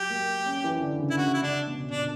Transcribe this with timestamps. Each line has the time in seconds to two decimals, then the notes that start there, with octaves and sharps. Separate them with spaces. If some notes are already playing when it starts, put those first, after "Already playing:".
Already playing: F#3 G4
0.10 A#3
0.46 C#4
0.64 E3
0.81 D3
0.99 C#3
1.10 E4
1.18 C#3 F#4
1.34 E4
1.42 C#3 D4
1.67 B2
1.90 A#2 D4